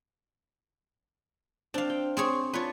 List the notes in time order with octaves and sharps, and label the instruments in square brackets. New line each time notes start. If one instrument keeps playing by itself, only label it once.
[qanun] C4 [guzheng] D4 F5
[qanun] G5
[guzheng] C4 G#4 C#5
[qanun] D4 F4 C#6 [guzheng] B4 C#5